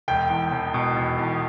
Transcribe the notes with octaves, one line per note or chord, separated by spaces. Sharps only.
E1 G5
E2
E1
B2
E1
E2